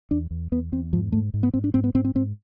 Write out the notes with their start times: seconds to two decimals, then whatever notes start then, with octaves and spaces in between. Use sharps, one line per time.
0.11 E2 D4
0.31 E2
0.52 E2 B3
0.72 E2 C4
0.93 G#2 F3
1.12 G#2 A3
1.34 G#2
1.43 B3
1.54 G#2 C4
1.64 D4
1.74 G#2 C4
1.84 B3
1.94 G#2 C4
2.05 C4
2.15 G#2 C4